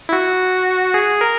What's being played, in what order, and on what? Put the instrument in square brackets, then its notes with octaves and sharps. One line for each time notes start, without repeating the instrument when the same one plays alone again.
[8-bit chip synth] E4
F#4
G#4
A#4